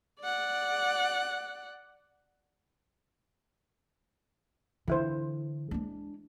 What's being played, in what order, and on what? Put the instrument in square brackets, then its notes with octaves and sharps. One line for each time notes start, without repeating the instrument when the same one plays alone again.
[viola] D5 F#5
[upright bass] D3 [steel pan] E3 E4 C5
[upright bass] G#3 D4